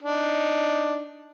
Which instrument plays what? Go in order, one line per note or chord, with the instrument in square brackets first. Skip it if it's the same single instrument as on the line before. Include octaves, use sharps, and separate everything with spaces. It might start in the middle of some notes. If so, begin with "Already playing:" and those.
[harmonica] D4 D#4